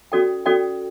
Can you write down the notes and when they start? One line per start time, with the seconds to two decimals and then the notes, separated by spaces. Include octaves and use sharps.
0.12 C#4 F#4 A4 D5 G5
0.46 C#4 F#4 A4 D5 G5